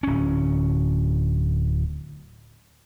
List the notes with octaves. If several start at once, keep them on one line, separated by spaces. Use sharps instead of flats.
D1 C#4